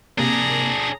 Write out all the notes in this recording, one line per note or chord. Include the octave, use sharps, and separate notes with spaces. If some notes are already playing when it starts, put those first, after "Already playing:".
C3 A#3 D4 G#4 A#5